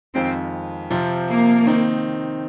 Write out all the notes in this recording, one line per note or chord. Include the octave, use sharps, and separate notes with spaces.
F2 D#3 G#3 C4 F4
C3 F3 C4 F4
A#3
D#3 C4 D#4